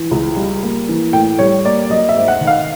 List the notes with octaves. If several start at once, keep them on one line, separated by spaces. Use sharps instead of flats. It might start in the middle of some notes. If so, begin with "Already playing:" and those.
Already playing: E3
C#2
G3
A#3
E3
A2 G5
G3 C#5
A#3 D5
F#3 D#5
E5
G#2
F#5
D#3
F5